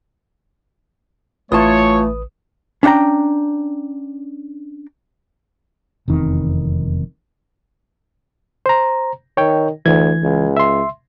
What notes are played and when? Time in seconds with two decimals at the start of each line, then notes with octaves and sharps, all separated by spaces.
1.52 A1 E3 A3 F4 B4 C#5 A5 D#6
2.83 C#4 D4 F#5 G5 A#5
6.08 F1 E2 D#3 C4
8.66 C5 A#5
9.37 D#3 C#5 G5
9.86 D2 E3 G#6
10.23 C#2
10.57 E5 C6